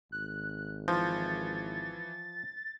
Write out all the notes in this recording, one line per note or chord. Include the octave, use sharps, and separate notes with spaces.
G#1 F#6
E3 F3 G6 A6